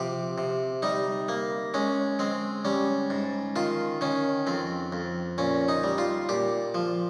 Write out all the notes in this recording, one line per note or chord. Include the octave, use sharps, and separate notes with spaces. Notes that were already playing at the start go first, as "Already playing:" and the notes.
Already playing: C3 F3 G4
C3
G3 D#4
A#3
G#3 C#4
G#3 C4
G3 C#4
G#2
D#3 F4
D#3 C#4
F2 C4
F2
A#2 C#4
D#4
G3
F4
A#2 G4
F3